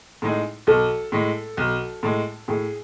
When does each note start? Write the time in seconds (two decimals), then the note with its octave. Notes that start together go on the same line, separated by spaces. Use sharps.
0.22 A2 G#3 D#4 G#4
0.67 B1 A4
1.12 A2 G#3
1.57 B1
2.03 A2 G#3
2.48 A2 G#4